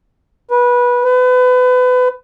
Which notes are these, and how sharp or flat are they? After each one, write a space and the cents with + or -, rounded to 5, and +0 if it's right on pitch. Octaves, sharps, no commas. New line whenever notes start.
B4 -20
B4 +30